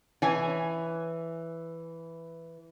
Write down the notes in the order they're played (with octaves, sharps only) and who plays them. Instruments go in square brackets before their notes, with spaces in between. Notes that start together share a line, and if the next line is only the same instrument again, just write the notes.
[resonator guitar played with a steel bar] E3 C#5 G#5